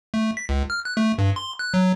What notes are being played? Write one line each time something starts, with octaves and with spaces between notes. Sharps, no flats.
A3
B6
C#2
F6
F#6
A3
G2
C6
F#6
F#3